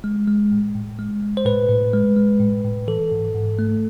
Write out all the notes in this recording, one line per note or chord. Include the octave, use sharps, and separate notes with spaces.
G#3
G#3
A2
A2
G#3
G#3
C5
A2 B4
A2
G#3
G#3
A2
A2
E3 A4
G#2
G#2
A3